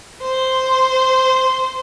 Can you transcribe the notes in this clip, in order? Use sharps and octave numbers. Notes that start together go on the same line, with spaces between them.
C5